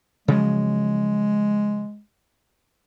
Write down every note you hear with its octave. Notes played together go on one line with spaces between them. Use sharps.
C#3 F3 F#3 G#3